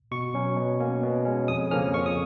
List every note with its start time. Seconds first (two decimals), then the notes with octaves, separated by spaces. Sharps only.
0.11 B2 C#6
0.34 F#3 C#4
0.56 B2
0.80 A#3 C#4
1.03 B2
1.25 G#3 C#4
1.48 F2 D#6
1.71 C#3 F3 A#3 C#4 F6
1.94 F2 C#6
2.06 D#6